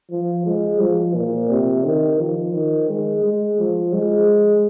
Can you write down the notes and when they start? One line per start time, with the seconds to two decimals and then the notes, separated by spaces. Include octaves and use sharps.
0.11 F3
0.46 G#3
0.81 F3
1.15 A#2
1.50 C3
1.84 D#3
2.19 F3
2.54 D#3
2.89 G#3
3.24 G#3
3.59 F3
3.93 G#3